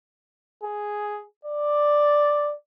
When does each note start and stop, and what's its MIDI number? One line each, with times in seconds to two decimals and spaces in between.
0.63 1.22 68
1.45 2.54 74